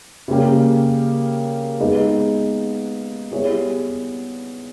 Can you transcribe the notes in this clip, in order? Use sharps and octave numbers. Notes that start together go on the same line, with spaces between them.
C#3 G3 A#3 C#4 G4
G#3 B3 D#4 G#4 B4
G3 B3 E4 G#4 C#5